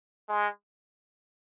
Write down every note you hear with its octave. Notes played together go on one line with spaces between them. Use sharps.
G#3